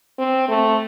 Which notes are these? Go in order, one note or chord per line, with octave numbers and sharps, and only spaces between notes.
C4
A3